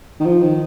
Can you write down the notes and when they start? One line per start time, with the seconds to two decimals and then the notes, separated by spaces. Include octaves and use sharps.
0.20 D#3
0.25 F3
0.42 D#3